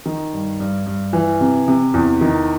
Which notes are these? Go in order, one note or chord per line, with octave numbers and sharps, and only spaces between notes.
D#3
G2
G2
G2
E3
C3
C3
E2
D#3